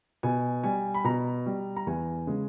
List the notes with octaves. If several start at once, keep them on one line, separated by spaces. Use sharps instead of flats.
B2 G#5
G3 G#5
B5
B2 A#5
G3
A#5
E2 G#5
C#3 G#3